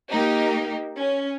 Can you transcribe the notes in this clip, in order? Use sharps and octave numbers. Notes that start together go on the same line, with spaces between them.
A#3 D#4 G4
C#4